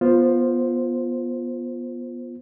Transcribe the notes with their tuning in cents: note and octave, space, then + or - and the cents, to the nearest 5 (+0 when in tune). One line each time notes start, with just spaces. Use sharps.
B3 -15 F4 +0 C5 +0